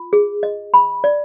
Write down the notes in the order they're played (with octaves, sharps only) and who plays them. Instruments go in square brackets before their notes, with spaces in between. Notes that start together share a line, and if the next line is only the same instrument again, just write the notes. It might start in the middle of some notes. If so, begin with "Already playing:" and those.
Already playing: [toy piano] F4
G#4
D#5
B5
D5